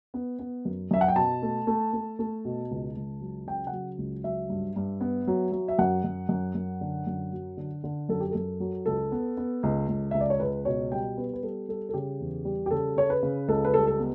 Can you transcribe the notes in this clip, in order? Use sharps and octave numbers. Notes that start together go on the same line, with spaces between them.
B3
B3
F#2
F#2 E5
F#5
G5
B2 A5
A3
A3
A3
A3
B2
C#2
C#2
F#3
C#3 G5
F#5
F#3
C#2
F#3 E5
G2
G2
B3
F#3
F#3
E5
F#2 F#5
F#2
F#2
F#2
D3
F#2
F#3
D3
D3
F#2 A4
G4
F#2 A4
F#3
C#2 A4
B3
B3
C#2
C#2
C#2 E5
D5
C#5
C#2 B4
B2 C#5
G3 G5
B3 B4
B4
G3 A4
G3 A4
A4
C#3 G4
E2
G3
G4
C#3 A4
C#3 C#5
B4
C#3
C#2 A4
B4
G3 A4
A4
B3